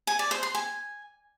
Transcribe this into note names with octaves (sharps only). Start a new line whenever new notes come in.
G#5
D5
C5
C6
G#5